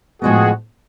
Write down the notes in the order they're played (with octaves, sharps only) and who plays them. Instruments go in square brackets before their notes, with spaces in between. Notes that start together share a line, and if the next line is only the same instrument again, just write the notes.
[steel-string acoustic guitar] A2 F3 G#3 B3 [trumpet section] F#4 G#4